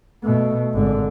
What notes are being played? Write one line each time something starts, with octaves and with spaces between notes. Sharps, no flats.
B2 A3
G#1 D3